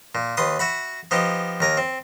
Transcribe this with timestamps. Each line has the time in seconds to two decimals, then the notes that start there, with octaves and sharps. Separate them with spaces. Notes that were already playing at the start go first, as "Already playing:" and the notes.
0.15 A#2
0.37 D#2 B4 C6 D#6
0.59 F#4 E5 F#5 B5
1.11 F3 B3 D#4 G4
1.60 D#2 A#4 G#5
1.77 C4